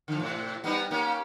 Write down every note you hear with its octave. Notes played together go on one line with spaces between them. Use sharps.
D3 F3
A2 C3
G3 B3 D#4
A#3 C#4 G4